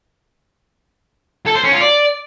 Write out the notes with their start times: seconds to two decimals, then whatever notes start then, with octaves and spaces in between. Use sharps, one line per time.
1.47 A4
1.55 C5
1.64 C#4
1.73 F4
1.81 D5